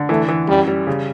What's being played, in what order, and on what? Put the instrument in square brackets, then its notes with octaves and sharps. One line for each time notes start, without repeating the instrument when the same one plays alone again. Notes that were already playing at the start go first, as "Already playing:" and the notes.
Already playing: [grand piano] D3
[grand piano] E3 [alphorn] A3
[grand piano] E3
[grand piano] F#2 [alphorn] G3
[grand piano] G3
C#3